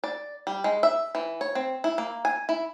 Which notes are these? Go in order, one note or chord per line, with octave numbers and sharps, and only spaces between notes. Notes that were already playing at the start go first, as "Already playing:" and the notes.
D5
G3
G#3
E5
E3
C#5
C4
E4
A#3
G#5
E4